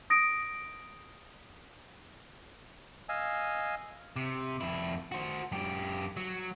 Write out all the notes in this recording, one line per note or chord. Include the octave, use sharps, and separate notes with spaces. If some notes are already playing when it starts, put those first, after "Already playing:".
D#6 A#6 D7
D#5 F5 G#5 E6
C3
F2 E4
F#4 C5
F#2 G4
F#3